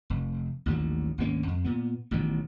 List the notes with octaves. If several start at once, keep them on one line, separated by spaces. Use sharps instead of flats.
F1
A1 D#2 D3 F#3
G#1 D2 A#3 C#4
F2
A#2 B3
A1 B2 D#3 F#3